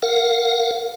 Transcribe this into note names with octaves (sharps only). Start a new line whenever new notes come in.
A#4 F5 F#5